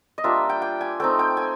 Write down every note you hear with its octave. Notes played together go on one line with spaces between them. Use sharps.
D#5
G3 A#3 D4 F4 E5
G5
G5
G#5
A3 C4 D#4 G5
G5
G#5